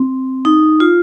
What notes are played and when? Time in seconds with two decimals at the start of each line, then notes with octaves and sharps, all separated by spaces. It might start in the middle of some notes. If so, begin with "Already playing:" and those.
Already playing: C4
0.45 D#4
0.80 F4